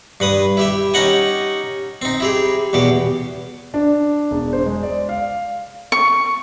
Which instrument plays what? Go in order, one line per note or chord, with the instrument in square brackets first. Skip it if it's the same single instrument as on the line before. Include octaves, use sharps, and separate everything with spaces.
[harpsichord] G2 B4 D#6
E4 G4 E5
C#4 D#4 G4 D#5 F#5 G#5
C4 D#4
E4 G4 G#4
E2 B2 G4 D6
[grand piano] D4
E1
C5
G#3
D5
F5
[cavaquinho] C#6